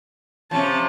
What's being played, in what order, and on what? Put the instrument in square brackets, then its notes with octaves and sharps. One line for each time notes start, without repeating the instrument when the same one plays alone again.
[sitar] C3 F3 [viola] C#4 A5